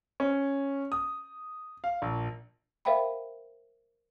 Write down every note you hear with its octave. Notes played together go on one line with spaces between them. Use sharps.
C#4
D#6
F5
A#1
A#4 C5 E5 F5 G5 B5